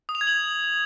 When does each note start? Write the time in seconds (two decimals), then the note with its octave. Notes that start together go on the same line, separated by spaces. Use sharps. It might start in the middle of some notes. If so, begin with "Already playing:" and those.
0.09 D#6
0.15 F7
0.21 G#6
0.27 F#7